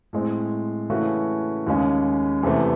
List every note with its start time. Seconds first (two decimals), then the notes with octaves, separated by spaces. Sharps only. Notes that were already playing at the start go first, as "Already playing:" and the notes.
0.13 A2 G#3 C4
0.90 C#3 E3 A3 C#4 F#4
1.67 D#2 C#3 G#3 C#4
2.43 E2 C3 E3 A3